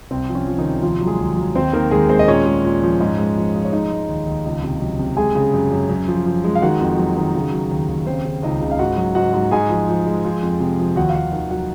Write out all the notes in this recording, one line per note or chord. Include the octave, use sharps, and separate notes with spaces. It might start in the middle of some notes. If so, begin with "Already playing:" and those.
C2 C4
F3
C#4
F3
D#3 D#4
C2
D#2 F3 F4
F#3
G#3 G#4
D#2
F#3
D#2 C4 C5
D#3 A#3 A#4
D#2 G#3 G#4
G#3 C4 C5
D#5
A#2 C#4 C#5
G#3
A#2
F3
G#2
G#3
F3
F3
C#5
G#3 D#4 D#5
G#3
D#2
D#2
C#2
C3
F#3
C3
G#3 G#4 G#5
C#3
F#2
F#2
F#2
F3
F3
G#3
F5
D#3 F#4 F#5
F2
F#3
D#3
C#3
F#3
D#2
D#2
C#3 C4 C5
C#3
C#2 D#4 D#5
C#3
F5
G#2 F#4 F#5
F#3
G#2 F#4 F#5
G#2
G#2 G#4 G#5
F3
F3
G#3
F3
F2
C3
F3
D#2 F#4 F#5
F5
D#2 F#4 F#5
D#3
F#3 F#4 F#5